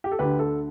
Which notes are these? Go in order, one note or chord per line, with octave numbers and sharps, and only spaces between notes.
G4
A4
D2 D3 G4 B4
A4